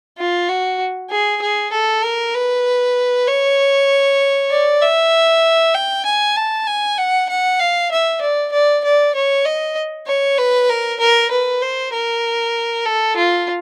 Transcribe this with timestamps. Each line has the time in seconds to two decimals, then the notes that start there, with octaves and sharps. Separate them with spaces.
0.18 F4
0.49 F#4
1.10 G#4
1.42 G#4
1.72 A4
2.03 A#4
2.34 B4
3.27 C#5
4.51 D5
4.81 E5
5.74 G5
6.05 G#5
6.36 A5
6.67 G#5
6.98 F#5
7.29 F#5
7.60 F5
7.91 E5
8.21 D5
8.52 D5
8.84 D5
9.15 C#5
9.45 D#5
10.07 C#5
10.38 B4
10.69 A#4
11.00 A#4
11.31 B4
11.62 C5
11.93 A#4
12.86 A4
13.17 F4